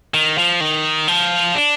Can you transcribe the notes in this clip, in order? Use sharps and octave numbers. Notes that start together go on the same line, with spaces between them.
D#3
F3
D#3
F3
D4